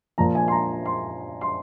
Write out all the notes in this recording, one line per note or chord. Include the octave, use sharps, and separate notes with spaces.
A#2 F3 A#5
G#5
C6
A#5
C6
C6